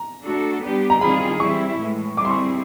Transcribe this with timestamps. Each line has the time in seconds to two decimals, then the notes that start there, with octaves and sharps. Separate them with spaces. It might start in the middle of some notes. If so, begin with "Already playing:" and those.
Already playing: A#5
0.23 A3 D4 F#4 A4
0.62 G3 B3 D4 G4
0.90 A#5
1.01 D#3 G3 C4 F4 G#4 B5
1.40 E3 G3 C4 E4 C#6
1.78 A2 E3 G#3
2.17 G3 C4 E4 G#4 D6
2.25 C6
2.30 C#6